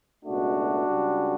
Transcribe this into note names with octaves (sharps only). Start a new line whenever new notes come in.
C#2 B2 A3 D4 F#4
C#2 C#3 G3